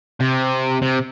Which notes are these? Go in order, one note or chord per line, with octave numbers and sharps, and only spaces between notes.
C3
C3